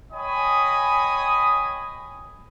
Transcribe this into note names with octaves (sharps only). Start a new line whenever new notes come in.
C#5 D#5 G5 G#5 B5 D#6